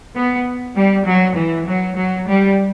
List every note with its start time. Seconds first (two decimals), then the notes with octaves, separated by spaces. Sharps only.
0.16 B3
0.76 G3
1.06 F#3
1.36 E3
1.67 F#3
1.97 F#3
2.28 G3